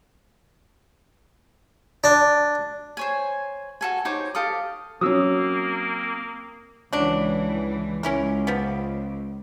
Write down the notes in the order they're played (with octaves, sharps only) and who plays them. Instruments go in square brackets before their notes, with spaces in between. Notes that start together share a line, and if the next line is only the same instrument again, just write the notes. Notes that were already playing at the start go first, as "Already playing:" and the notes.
[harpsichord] D4
[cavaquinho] C5 C#5 G#5
F#4 A4 G#5
D#4 G4 C5 C#5
G4 A4 F5 D#6
[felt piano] F#3 C#4 [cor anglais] A#3 [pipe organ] C4 [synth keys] D#6 E6
[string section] C#2 E3 [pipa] F#3 D4
[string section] C#2 [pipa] C#4 E4 A#4
[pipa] F3 B3